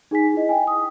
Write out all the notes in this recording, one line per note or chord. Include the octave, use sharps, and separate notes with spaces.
D#4 G#4 G#5 B6
E4 D#5
G5 G#5
D#6